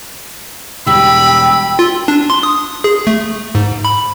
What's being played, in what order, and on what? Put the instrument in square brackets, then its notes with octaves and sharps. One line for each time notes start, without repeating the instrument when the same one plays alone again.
[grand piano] E1 G3 [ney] G5 [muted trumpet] B5 [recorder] E6
[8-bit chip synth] F4
D4
C6
D#6
G#4
A3
G#2
B5